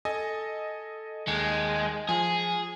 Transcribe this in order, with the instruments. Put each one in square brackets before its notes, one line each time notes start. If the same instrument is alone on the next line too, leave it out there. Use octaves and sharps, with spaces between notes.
[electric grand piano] A4 D#5 G#5
[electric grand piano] D#2 C#7 [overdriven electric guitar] G#3
[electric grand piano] F3 [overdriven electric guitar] G#4